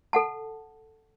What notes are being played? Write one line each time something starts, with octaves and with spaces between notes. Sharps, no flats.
A4 F#5 A5